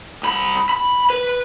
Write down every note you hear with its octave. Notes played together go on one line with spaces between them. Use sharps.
C2 B5
B5
B4